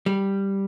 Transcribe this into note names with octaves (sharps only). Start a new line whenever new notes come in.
G3